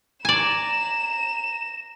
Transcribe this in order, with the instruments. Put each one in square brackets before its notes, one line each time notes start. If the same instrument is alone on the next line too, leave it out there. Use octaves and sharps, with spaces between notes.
[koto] D5 G#5 [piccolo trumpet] A#5 [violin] E7